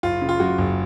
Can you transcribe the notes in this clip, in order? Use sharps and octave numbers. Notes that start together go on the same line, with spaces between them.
F#1 F4
C#3
F4
F#2 F#4
F#1